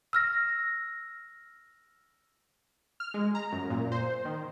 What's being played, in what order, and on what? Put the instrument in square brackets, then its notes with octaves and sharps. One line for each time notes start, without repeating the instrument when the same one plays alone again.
[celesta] E6 F6 A#6
[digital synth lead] F6
G#3
A#5
F#2
A#2
C5
D#3